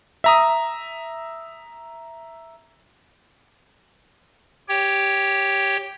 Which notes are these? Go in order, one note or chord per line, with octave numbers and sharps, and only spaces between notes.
E5 A#5 D#6
G4 C#5 G5